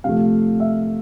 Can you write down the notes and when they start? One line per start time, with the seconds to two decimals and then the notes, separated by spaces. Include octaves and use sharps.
0.04 C3 F3 A3 F5
0.60 E5